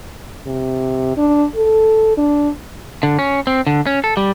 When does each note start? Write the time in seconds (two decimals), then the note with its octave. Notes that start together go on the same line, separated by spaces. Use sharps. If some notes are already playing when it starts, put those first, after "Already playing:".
0.47 C3
1.17 D4
1.55 A4
2.17 D4
3.03 D3
3.19 C#4
3.47 C4
3.67 D3
3.87 C#4
4.04 A4
4.17 G3